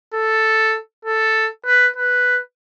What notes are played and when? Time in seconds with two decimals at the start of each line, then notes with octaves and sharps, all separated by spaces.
0.14 A4
1.05 A4
1.65 B4
1.96 B4